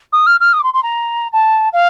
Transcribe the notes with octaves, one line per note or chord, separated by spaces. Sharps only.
D#6
F6
F6
D#6
D6
C6
C6
A#5
A5
F5